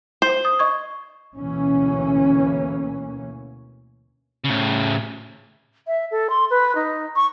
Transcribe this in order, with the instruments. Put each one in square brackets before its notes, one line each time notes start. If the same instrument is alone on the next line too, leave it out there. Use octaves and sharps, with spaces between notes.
[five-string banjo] C5
[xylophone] D#6
D#5 C#6 G#6
[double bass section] D2 B2 E3 A#3 C#4
[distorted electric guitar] A2 C#3
[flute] E5
A4
C6
B4
D#4
C#6